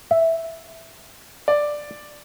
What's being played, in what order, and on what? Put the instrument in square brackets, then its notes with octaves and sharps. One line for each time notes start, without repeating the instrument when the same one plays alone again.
[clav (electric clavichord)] E5
[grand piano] D5